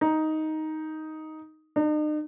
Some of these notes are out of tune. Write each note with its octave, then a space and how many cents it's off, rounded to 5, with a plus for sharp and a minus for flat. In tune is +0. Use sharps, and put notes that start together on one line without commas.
D#4 +5
D#4 -45